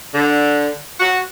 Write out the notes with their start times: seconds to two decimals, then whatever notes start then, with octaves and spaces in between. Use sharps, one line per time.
0.14 D3
0.98 F#4